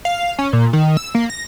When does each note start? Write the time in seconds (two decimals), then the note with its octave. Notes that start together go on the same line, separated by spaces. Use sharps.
0.05 F5
0.39 C#4
0.53 A#2
0.73 D#3
0.97 E6
1.15 A#3
1.30 A#6